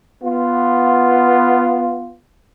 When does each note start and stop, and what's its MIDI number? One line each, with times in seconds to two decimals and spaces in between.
0.22 2.14 59
0.22 2.14 65